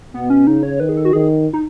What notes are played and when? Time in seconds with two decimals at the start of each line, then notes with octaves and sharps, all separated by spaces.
0.14 B2 B3
0.30 C#4
0.47 C#3 D#4
0.63 C#5
0.80 D#3 B4
0.89 G#4
0.97 A4
1.05 F#4
1.13 D#3 G#4
1.53 D#4